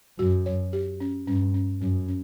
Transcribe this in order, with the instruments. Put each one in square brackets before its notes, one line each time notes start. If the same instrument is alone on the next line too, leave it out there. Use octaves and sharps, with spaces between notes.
[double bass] F#2 [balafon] F#4
[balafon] C#5
G4
C#4
[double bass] G2 [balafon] C#4
[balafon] C#4
[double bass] F#2 [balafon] C#4
[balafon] C#4